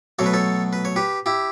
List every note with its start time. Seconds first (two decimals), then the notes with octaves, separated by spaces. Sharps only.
0.19 B2 F#3 A3 C#5
0.26 B4
0.33 A4 C#5
0.73 B4
0.85 C#5
0.96 G4 B4
1.26 E4 G4